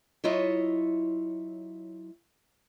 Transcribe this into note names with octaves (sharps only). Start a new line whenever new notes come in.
F#3 E4 F4 C#5 D#5 E5